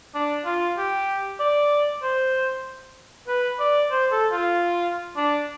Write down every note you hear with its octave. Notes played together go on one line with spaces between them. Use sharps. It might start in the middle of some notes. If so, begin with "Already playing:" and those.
D4
F4
G4
D5
C5
B4
D5
C5
A4
F4
D4